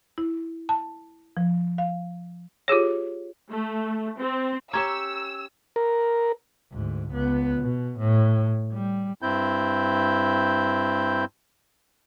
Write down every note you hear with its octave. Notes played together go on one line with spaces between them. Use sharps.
E4
A5
F3
F5
F4 G4 G#4 C#5
A3
C4
C#4 G4 C#5 A#5 C#6 E6 G#6
A#4
D2 G#2
C#2 B3
B2
A2
G3
G2 C4 E4 G6